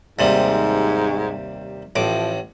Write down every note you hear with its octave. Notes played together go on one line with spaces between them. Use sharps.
D#2 G#2 C3 G3
A1 A2 F3 D6